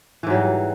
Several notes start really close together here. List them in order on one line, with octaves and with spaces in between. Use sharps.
E3 G#2 F#3 G3